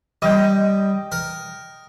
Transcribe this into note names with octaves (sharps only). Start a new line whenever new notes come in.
G3 D#5 G5
A#4